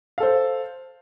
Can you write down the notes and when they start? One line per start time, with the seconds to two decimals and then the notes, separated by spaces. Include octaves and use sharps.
0.18 F5
0.20 A4
0.23 C5